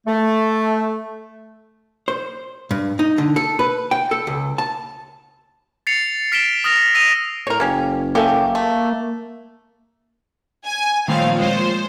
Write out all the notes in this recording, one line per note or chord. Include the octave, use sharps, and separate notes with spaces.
A3
C5
G2
D#4
D3
A4
B4
G5
A4
C#2
A5
A6 C7 C#7 F7
F6 B6 D7 E7 G7
D#6 F6 A#6 F7
E6 A#6 D#7 F7
A2 A#4 C5 C#5 A#5
F#1 A#3 C#4 G4 C#5
A#3 C#4 G4 A4 E5 A5
A3
G#5
A#2 D#3 F3 G3 A3 C4 C#5 F5
G#3 F4 C5